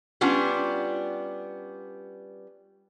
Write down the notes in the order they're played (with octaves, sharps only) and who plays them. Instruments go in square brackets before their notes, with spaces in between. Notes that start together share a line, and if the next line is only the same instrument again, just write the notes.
[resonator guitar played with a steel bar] G3 B3 C#4 D4 F4